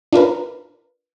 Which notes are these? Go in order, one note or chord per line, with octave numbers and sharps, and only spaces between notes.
D4 F4 A#4 B4